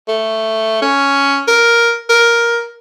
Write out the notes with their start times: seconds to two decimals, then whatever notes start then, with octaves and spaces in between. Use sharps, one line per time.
0.08 A3
0.82 C#4
1.48 A#4
2.09 A#4